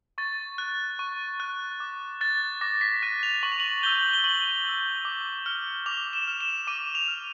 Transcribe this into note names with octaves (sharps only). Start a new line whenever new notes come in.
C#6 A6
F#6
C#6
F#6
D6
F#6 A6
D6 A#6
B6
F#6 D#7
F7
C#6 F#7
F7
F#7
E6 G6 G7
G7
C#6 F#7
E6 G6
D6
F6
D6 F7
E7
F6
E7
D6 D#7
F7
F6